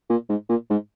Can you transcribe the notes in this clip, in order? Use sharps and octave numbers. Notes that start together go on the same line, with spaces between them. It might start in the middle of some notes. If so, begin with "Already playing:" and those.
A#2
G#2
A#2
G#2